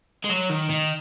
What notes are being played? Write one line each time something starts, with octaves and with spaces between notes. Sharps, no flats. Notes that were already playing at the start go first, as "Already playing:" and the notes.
G#3
F#3
D#3
D#3